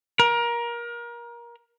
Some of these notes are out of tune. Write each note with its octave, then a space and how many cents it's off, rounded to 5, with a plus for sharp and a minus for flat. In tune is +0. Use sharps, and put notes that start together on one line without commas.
A#4 +25